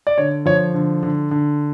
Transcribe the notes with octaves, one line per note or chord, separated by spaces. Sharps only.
D5
D3 C#5
F3 C#5
D3
D3
D3